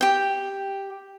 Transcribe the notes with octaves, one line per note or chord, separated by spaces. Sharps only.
G4 G5